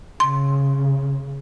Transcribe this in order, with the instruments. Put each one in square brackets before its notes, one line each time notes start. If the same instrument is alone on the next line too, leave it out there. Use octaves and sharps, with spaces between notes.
[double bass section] C#3 [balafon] C6